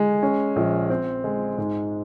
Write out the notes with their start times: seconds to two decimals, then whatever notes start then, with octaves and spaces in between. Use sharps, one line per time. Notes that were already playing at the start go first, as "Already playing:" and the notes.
Already playing: G#3
0.23 C#4
0.56 A#1
0.90 C4
1.24 G#3
1.58 G#2